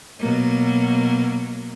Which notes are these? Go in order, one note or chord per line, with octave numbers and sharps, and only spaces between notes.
B2 F#3 A#3